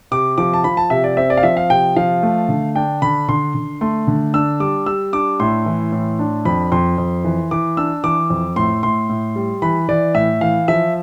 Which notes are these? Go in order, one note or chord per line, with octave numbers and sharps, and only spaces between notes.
C3 D6
F3 D6
A5
F3 B5
A5
C3 E5
D5
C4 E5
D5
F5
F3 E5
F5
C3 G5
F3 F5
A3
D3
D4 G5
D3 B5
D3 C6
D3
A3 C6
D3
D4 E6
G3 D6
G3 E6
D4 D6
A2 C6
E3
A2
D4
F2 B5
F2 C6
F2
E3
E3 D6
D4 E6
E3 D6
F2
A2 C6
A2 C6
A2
G3
E3 B5
E3 D5
A2 E5
E3 F5
F3 E5